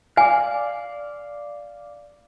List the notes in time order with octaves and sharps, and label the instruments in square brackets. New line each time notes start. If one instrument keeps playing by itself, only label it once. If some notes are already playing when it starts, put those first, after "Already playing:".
[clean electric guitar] D5 F5 [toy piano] G#5